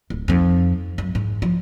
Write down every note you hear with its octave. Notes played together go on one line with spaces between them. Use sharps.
D1
F2 D#4
F#2
G#2
F3